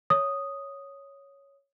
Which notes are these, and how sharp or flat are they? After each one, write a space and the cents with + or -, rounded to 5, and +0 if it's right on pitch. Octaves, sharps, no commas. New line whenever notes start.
C#5 +0 D#6 +0